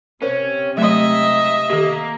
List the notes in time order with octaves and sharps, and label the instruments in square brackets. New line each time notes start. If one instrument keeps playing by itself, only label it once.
[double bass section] C3 [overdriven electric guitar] C#4 [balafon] A#4 C5
[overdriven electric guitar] G#2 [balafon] F#3 A3 [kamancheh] D#5 E5
[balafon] D#3 G4 [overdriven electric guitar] A#3